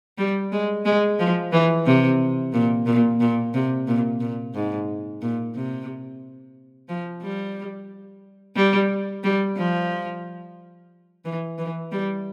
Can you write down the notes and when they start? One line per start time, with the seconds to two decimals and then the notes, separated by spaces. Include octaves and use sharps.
0.18 G3
0.52 G#3
0.85 G#3
1.19 F3
1.52 E3
1.86 C3
2.53 A#2
2.86 A#2
3.20 A#2
3.54 C3
3.87 A#2
4.20 A#2
4.54 G#2
5.22 A#2
5.55 C3
6.89 F3
7.22 G3
8.56 G3
9.24 G3
9.57 F3
11.25 E3
11.58 E3
11.92 G3